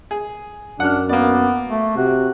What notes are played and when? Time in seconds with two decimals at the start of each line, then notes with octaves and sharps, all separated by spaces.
0.11 G#4
0.80 F#2 D4 F#5 F6
1.09 A#3 B3 D5
1.68 A3
1.97 C3 F#4